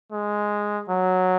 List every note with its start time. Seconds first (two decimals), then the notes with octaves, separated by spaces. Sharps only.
0.12 G#3
0.89 F#3